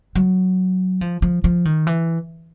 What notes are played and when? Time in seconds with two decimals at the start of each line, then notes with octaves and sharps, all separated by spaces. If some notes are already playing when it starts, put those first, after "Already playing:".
0.15 F#3
1.01 F3
1.22 F3
1.44 F3
1.65 D#3
1.87 E3